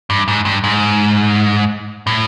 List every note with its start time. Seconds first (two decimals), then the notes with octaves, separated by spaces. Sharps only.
0.10 G2
0.28 G#2
0.45 G2
0.64 G#2
2.07 A2